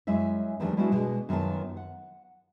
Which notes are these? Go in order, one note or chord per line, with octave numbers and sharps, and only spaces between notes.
F#2 G#3 E4 E5
E2 D#3 F3 G3 A3 D4
G3 G#3 B3 D4 E4 F#4
B2 G#3 D4
F#2 D#3 B3 F4 A5
F#5